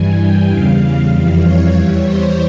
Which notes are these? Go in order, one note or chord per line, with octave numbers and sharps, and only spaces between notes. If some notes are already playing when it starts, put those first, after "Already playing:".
Already playing: G2 E3 G3 G#5
G5
E2 C#3 G3 F5
F2 E3 G3
C#5
E2 E3 G3
C5